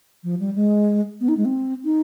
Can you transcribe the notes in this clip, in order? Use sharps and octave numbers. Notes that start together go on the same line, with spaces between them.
F3
G3
G#3
B3
D#4
G#3
C4
D#4